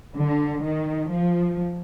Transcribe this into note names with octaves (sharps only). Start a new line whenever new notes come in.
D3
D#3
F3